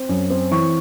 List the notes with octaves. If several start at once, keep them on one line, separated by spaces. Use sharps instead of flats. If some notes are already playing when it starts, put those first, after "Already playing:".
Already playing: C4
F#2
C4
E3 C#6